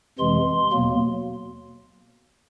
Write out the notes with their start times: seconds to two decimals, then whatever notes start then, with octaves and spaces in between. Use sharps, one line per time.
0.19 F2 C3 E3 G#3 C6
0.72 E2 B2 F#3 A#3